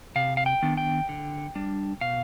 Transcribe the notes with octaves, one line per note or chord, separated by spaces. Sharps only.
C3 F5
F5
G5
D#3 B3 D4
G5
D3
G3 D4
B2 F5